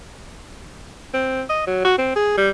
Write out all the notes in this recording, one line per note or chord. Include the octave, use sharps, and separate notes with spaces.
C4
D#5
F#3
F#4
C4
G#4
G3